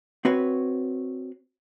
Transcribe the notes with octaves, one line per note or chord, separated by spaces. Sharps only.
C4 F#4 B4 C#5